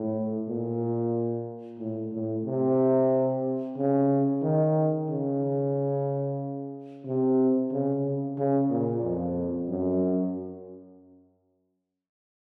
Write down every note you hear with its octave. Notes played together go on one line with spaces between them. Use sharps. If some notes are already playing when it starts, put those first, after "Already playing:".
Already playing: A2
A#2
A2
A2
C3
C#3
D#3
C#3
C3
C#3
C#3
A#2
F2
F#2